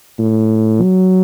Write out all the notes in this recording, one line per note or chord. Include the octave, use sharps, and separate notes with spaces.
A2
F#3